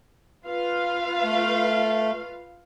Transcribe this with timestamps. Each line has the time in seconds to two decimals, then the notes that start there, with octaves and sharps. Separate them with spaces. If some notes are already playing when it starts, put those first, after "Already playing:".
0.45 F4 B4 F5
1.24 A3